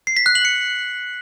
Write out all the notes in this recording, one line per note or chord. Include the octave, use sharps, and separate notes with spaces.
C7
B6
F#6
F#7
C#7